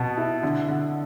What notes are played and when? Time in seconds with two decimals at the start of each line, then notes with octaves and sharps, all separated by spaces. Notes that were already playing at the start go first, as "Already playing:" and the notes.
Already playing: B2 B3 F#5 A5
0.17 E4
0.43 D3
0.68 D3